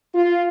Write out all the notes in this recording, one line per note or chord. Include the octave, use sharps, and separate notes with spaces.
F4